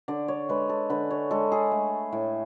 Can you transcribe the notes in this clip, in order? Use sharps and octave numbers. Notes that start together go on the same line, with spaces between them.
D3 D5
C#5
G#3 B4
A4
D3 B4
C#5
G#3 A4
G#4
A3
A2